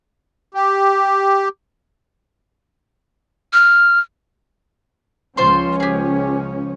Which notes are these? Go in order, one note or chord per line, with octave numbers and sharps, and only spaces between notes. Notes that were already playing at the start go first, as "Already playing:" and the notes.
G4
F6
C#2 F3 C#4 F4 C5 C6
G4 G#4